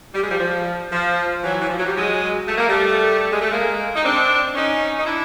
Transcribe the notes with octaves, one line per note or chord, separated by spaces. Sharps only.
G3
G#3
F3 G3
F3
F3
E3 F#3
E3
F3
F#3
G3
F#3 G#3
A3
A#3
G3 A3
G#3
A3
G#3 A#3
D#4
C4 D4
C#4 D#4
D#4
D4 E4